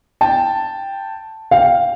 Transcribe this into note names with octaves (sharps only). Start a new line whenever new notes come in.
G5 A5
F5 G5